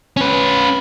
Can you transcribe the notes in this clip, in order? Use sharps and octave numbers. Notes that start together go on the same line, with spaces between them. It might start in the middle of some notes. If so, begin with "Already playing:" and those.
C#4 B4